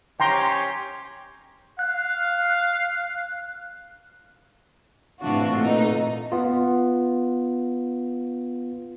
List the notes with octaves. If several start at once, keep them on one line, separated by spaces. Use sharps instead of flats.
C#4 G4 C#5 G5 A#5 C6
F5 F#6
A2 C3 E3 D4 F4 F#4
A#2 A3 D#4
B3 F4